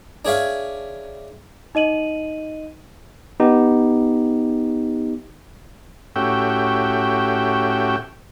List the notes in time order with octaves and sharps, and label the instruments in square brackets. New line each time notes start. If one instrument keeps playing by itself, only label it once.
[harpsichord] D4 G#4 C#5 E5 F5
[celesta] D#4 D#5 D#7 F#7
[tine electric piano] B3 D#4 G4
[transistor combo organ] A2 C#4 F#4 G4 E5 G5